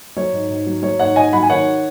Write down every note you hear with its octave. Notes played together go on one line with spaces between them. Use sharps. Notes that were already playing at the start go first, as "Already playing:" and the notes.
F#3 C#5
G#2
G#2
F#3
F#3 C#5
G#2 C#5 F#5
G#2 D#5 G#5
F#3 F#5 B5
G#5
D#3 C#5 F#5